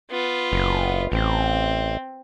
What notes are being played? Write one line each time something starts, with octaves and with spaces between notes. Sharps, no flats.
B3 F4
F#1
A1 C4